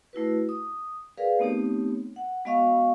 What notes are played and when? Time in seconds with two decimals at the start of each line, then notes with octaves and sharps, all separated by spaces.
0.13 A3 E4 F#4 B4
0.49 D#6
1.18 G#4 A#4 B4 D5 F5
1.39 A3 B3 C4 D#4 G4 C#5
2.16 F#5
2.45 G#3 B3 F#4 D#5 F5 C#6